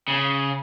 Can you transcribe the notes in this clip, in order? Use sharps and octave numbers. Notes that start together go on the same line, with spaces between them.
C#3